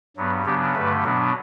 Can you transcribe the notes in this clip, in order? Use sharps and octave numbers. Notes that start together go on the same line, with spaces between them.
G2 F#3 B3
C#3 F#3 B3 D4 G4
G2 D3 A3 B4
B2 F#3 B3 D4